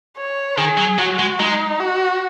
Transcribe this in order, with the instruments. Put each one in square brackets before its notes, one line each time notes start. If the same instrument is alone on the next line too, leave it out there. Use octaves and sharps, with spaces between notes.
[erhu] C#5
[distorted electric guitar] D#3 [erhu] G#4
[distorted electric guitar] F#3
[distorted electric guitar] F#3 [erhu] F#4
[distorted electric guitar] G#3
[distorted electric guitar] G#3 [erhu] D#4
[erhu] F#4